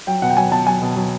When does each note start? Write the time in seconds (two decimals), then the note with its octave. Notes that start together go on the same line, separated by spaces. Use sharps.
0.07 F#3 G5
0.22 B2 F#5
0.30 G5
0.37 F#3 G#5
0.52 B2 A5
0.67 F#3 G#5
0.82 B2
0.96 F#3